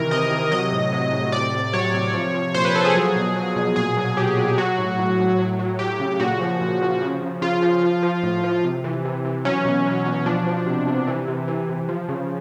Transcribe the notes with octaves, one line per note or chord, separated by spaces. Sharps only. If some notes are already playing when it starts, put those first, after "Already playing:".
Already playing: C3 D#3 E3 A#4
C3 D#5
C3
F#3 D#5
A2
F#3
A2
C3 D5
C3
F#3 C#5
C3
F3
F3
A#2 C5
B4
F3 A4
G#4
F#3
B2
F#3
B2
A#2 G#4
F#3
F#3 G4
F#3
F#3 F#4
A2
A2
A2
F#3
F#3
F#3 G4
C#3
A#2 F#4
F3
A#2
F3
C#3
C#3
C#3 F4
F3
F3
F3
A2
F3
C3
E3
C3
E3
F#3 C#4
B2
F#3
B2
F3 D4
F3
C3
C3
E3
C3
E3
C3
F3
C#3